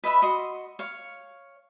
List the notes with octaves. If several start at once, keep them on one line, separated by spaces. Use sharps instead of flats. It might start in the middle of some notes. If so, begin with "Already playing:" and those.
B4 D#5 E5 B5
F#4 D#5 C6
C#5 F5